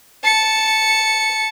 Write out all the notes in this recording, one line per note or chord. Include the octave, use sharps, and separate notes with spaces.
A5 C#7